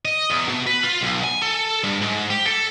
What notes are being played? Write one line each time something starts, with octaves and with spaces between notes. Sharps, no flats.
D#5
E2
B2
B4
F4
B1
G#5
A4
G2
G#2
G4
A4